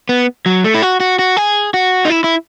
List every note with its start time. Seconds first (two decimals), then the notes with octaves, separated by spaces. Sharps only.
0.09 B3
0.46 F#3
0.64 A3
0.74 E4
0.82 F#4
1.00 F#4
1.19 F#4
1.37 G#4
1.74 F#4
2.05 D#4
2.10 E4
2.24 E4